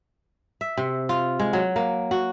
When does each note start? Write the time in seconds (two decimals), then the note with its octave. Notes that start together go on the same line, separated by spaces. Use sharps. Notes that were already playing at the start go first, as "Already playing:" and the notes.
0.61 E5
0.77 C3
1.09 F4
1.39 G#3
1.53 F#3
1.76 A#3
2.11 F#4